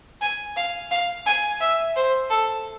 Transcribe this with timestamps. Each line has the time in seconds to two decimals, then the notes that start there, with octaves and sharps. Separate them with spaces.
0.22 G#5
0.57 F5
0.91 F5
1.26 G#5
1.61 E5
1.96 C5
2.30 A4